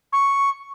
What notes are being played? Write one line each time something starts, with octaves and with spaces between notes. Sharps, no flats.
C#6